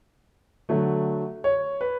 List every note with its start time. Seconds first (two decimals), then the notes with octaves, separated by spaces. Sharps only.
0.69 D3 F#3 A3
1.44 C#5
1.81 B4